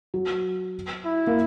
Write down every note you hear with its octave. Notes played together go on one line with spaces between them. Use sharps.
F#3
E4
A#3